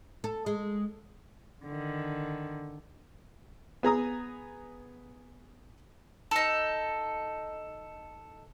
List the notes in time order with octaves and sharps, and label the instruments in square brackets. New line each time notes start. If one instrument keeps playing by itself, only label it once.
[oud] A4
G#3
[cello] D3 D#3
[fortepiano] B3 G#4 A#5 D#6
[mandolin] D#4 A4